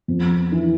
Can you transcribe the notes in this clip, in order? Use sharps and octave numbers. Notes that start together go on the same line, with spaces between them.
F2
E3